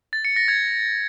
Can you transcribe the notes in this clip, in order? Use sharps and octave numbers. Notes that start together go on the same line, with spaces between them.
A6
C#7
A#6
G#6